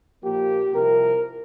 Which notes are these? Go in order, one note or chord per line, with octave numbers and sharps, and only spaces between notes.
A#2 F3 A#3 G4
C2 C3 F3 A#4